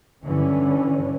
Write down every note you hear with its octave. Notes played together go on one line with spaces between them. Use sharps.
G2 D3 E3 C#4